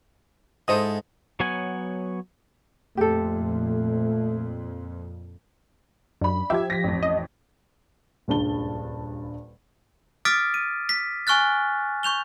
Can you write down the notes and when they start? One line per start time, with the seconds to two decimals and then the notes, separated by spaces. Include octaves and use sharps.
0.68 G#2 E4 A4 C5 D#5 D#6
1.40 F#3 B3 C#5 F#5 G#5
2.97 F2 A#2 A3 G4 A4
6.21 F#2 D4 B5
6.50 F3 G4 E5 G#6
6.70 A#6 B6
6.84 A1 F2
7.03 D#5
8.28 D#1 C#2 G2 D4 A5 G7
10.25 D6 D#6 F6 A6 B6 D7
10.54 D#7
10.89 B6
11.27 G#5 C#6 F6 F#6 A6
12.03 C#6 G6 F7 G7